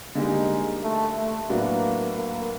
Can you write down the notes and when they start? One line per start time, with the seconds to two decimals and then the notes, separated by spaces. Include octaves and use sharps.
0.15 D3 G3 G#3 A#3 D#4 G4
0.83 A3
1.16 A3
1.50 A2 F#3 A#3 B3 D4 F#4
2.16 A#3